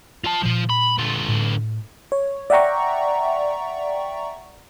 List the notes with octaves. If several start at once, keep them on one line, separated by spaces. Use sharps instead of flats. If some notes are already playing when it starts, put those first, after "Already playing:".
F4 A5
A#2 F3 G#3 F4
B5
D3 F4
A2
C#5
D5 E5 F#5 G5 A#5 C#6